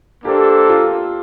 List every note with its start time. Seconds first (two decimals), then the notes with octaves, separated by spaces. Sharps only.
0.24 A#3 D4 G4 A4 C5
0.69 F4